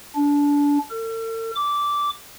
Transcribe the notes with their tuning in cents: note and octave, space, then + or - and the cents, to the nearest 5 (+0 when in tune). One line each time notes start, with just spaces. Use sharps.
D4 -25
A4 +45
D6 -10